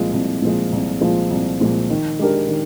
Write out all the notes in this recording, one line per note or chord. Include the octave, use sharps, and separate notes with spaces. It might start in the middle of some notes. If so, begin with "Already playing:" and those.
Already playing: C2 A#2 F3 G#3
C2
A#2 F3 G#3
C2
A#2 F3 G#3
C2
A#2 F3 G#3
D#3
G#3 D4 G4 A#4
D#3